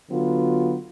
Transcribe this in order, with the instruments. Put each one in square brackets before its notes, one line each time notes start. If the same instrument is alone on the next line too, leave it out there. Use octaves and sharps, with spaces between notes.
[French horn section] D3 F#3 B3 F4 F#4